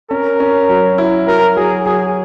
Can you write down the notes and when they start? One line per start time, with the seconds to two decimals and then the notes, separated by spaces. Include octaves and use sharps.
0.10 C#4 A#4
0.40 C#4
0.69 F#3
0.98 E4
1.27 F#3 A#4
1.57 F#3 G#4
1.85 F#3 G#4